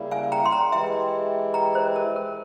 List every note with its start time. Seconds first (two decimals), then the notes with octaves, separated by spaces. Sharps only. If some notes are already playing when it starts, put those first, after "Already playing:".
Already playing: C#3 G3 A#3 E4
0.11 F5 G#5
0.32 G5 A#5
0.46 C6
0.52 G5 A#5
0.72 E3 G#3 E4 G4 E5 G5
1.54 G5 A#5
1.75 C5
1.96 A#4
2.16 A#4